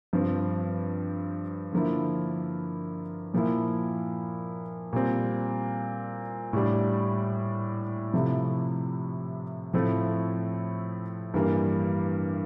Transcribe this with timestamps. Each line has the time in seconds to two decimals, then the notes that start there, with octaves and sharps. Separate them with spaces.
0.13 G2 F3 C4
1.73 D3 F3 A#3 E4
3.34 A#2 F3 A#3 E4
4.93 A#2 G3 C4
6.53 A2 G3 D4
8.14 C3 F3 A3 E4
9.73 A2 F3 A3 C4 E4
11.34 G2 E3 G3 A#3